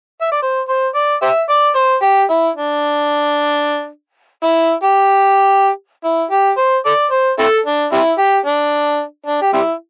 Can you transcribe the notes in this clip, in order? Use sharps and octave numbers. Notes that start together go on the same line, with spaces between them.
E5
D5
C5
C5
D5
G4 C5 E5
D5
C5
G4
E4
D4
E4
G4
E4
G4
C5
A4 D5
C5
C4 E4 A4
D4
G3 C4 E4
G4
D4
D4
G4
G3 C4 E4